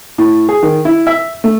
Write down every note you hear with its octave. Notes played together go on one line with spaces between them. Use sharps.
A2
G#4
D#3
E4
E5
A3